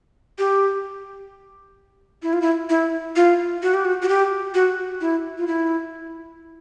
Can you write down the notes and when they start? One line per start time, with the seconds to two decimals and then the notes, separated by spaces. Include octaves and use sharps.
0.38 G4
2.22 E4
2.33 F4
2.42 E4
2.69 E4
3.16 F4
3.63 F#4
3.74 G4
3.85 F#4
4.02 F#4
4.09 G4
4.54 F#4
5.01 E4
5.38 F4
5.47 E4